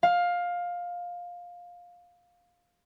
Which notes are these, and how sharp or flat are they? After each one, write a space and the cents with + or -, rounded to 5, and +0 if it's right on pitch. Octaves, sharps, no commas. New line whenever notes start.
F5 +15